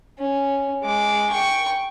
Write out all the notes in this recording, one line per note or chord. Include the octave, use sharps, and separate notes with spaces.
C#4
G#3 D6
G5 C#6